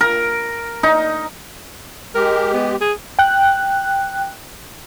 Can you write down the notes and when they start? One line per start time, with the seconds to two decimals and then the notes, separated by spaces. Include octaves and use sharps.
0.01 A#4
0.83 D#4
2.15 G#3 G4 A#4
2.53 B3
2.81 G#4
3.19 G5 F#6